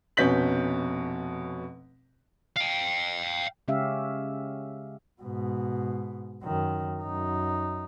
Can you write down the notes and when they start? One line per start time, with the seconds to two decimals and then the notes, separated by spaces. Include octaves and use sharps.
0.17 F1 B2 C#4 G6 B6 F#7
2.57 F5 G5
3.68 C#3 G#3 C#4 G4 E5 F5
5.22 G#2 B2
6.43 F#2 D#3
7.02 F#2 D#4